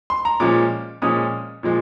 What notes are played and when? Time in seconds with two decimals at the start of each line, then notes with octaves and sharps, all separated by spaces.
0.10 C6
0.25 A#5
0.40 A#2 F3 G#3 C#4 D6
1.02 A#2 F3 G#3 C#4 D#6
1.63 A#2 F3 G#3